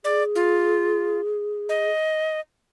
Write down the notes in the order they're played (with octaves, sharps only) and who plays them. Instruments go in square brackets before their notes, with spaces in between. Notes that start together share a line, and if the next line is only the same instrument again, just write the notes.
[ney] G#4 [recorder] D5
[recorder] F4
D#5